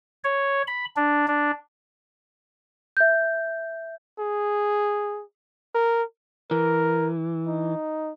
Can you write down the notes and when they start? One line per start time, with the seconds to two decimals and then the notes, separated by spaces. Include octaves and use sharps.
0.24 C#5
0.68 B5
0.96 D4
1.28 D4
2.97 E5 G6
4.19 G#4
5.75 A#4
6.51 E3 A#4
7.47 D#4